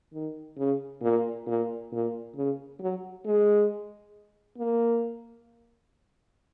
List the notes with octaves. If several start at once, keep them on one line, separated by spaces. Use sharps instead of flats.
D#3
C#3
A#2
A#2
A#2
C#3
F#3
G#3
A#3